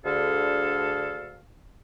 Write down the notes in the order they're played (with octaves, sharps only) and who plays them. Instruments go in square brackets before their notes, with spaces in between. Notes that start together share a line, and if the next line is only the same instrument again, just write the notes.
[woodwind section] D2 D3 G#4 A4 F5